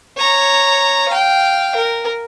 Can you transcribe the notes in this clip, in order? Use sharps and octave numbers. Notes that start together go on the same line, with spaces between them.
C#5 A#5
F5 G5
A#4